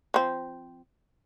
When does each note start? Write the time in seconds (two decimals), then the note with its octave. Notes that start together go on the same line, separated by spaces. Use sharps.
0.14 F3 C4